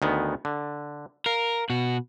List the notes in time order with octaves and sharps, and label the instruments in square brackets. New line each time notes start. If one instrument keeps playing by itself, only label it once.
[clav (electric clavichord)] D2 D#3 B3
D3
[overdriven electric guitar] A#4 [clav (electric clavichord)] F5
[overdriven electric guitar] B2 F#4